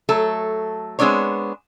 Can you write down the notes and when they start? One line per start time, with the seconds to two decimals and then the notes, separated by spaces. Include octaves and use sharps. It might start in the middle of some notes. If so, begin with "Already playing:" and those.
0.09 F#3 A3 A4
0.99 G#3 B3 C4 D4 C#5